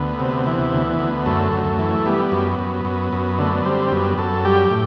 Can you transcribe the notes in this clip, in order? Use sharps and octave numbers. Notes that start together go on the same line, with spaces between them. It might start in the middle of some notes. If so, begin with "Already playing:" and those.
Already playing: D2 B3
C3
E3
D2
D2
F#2 A3
F#2
E3
G3 B3
F#2
F#2
F#2
F#2
D3 A3
B3
G3 C4
F#2 B3
F#2 A4
G3 G4
A2